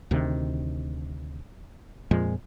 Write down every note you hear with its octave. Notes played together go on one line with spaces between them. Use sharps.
D2 C3 D#3
F2 A#2 F3 G#3